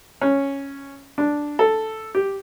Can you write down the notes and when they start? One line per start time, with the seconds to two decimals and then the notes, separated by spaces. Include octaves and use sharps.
0.21 C#4
1.18 D4
1.59 A4
2.15 G4